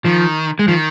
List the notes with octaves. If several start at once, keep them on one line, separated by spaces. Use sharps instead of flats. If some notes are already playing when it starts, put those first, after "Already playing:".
D#3 F3
G#3
D#3 F3